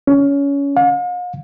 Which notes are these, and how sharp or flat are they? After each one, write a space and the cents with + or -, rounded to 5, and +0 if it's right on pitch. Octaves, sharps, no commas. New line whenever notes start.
C#4 +20
F5 +45